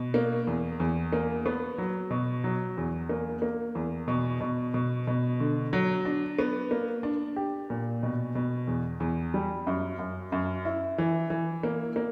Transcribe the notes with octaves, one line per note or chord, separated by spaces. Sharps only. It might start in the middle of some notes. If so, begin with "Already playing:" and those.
Already playing: B2
A#3
E2
E2
A#3
B3
F#3
B2
F#3
E2
A#3
A#3
E2
B2
B2
B2
B2
D3
F#3
D4
B3
A#3
D4
G4
A#2
B2
B2
E2
E2
G3
F#2
F#2
F#2
E4
E3
E3
A#3
A#3